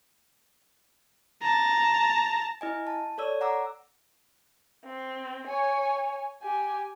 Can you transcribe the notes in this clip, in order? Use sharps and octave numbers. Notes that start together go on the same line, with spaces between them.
A5 A#5
E4 D#5 G#5
A5
A4 C#5 D5 E6
F#5 A#5 D6 E6
C4
C#5 G#5
G4 G#5